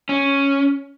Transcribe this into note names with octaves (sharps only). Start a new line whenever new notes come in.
C#4